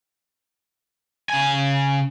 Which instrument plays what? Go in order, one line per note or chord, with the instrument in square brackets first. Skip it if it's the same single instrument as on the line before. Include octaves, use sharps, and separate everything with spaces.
[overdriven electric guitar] C#3 G#5